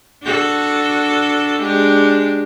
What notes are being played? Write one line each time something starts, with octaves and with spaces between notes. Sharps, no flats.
D4 F#4 A4
G#3 D4 G4